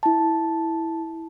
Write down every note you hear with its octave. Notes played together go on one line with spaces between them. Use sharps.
E4 A5